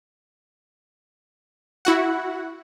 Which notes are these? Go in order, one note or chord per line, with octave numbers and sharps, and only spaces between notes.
E4 F#4 F#5